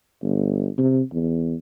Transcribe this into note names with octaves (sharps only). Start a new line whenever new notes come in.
G1
C3
E2